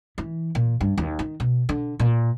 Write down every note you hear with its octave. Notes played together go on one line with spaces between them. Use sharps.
E3
A#2
G2
D#2
D#3
B2
D3
A#2